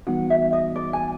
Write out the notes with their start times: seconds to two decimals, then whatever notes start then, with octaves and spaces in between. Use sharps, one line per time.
0.07 E3 G3 B3 D#4 F#4 F#5
0.30 E5
0.53 D#5
0.75 D5
0.93 G#5